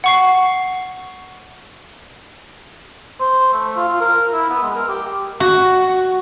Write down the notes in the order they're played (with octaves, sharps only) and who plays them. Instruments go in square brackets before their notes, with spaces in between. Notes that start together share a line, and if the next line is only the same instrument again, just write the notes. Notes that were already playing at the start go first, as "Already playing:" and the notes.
[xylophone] F#5 C#6 C7
[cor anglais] C5
A3
F4
F4
A#4
E4
B3
G#3
A#4
G4
[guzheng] F#4